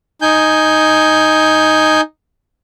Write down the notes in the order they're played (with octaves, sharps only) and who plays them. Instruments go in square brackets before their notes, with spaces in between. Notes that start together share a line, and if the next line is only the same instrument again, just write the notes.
[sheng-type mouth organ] D#4 G#5 G6